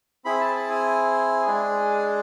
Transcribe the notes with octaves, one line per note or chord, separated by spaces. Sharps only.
C4 E4 G#4 B5
A5
A5
G#5
G#3 D4 G#4